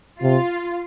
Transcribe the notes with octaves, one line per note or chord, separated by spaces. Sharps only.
C3 F4